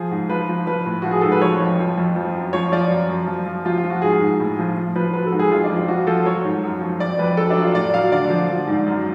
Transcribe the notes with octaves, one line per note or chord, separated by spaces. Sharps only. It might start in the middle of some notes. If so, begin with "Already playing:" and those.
Already playing: F3 G#4
G#2
F3 B4
F3
F3 B4
A2
F3 F#4
G#4
G#2 A4
B4
F3 C#5
F2
F3
F2
F3
F#2
F3 C#5
F3 D5
F#2
F#2
F3
F3
F3 F4
F4
F3
F#4
G#2 G#4
G#2
A2
F3
F3
F3 B4
F#3 B4
A4
G#2
G#4
F2 F4
D4
F2
F4
F3 F#4
F3 A4
F#3 C#5
G#2
F#2
F3
F2 D5
F2 B4
F#3 A4
D4
F#3
F4
A2 D5
F#3 F5
D3 D5
F3
F3
G#2
F#2